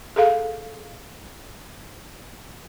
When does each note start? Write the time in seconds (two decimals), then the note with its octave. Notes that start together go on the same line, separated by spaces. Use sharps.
0.16 G#4 A4 F5